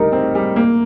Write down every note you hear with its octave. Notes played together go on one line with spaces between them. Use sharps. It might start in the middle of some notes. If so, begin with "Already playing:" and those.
Already playing: G3 D#4 G4 A#4
C4
G3
A#3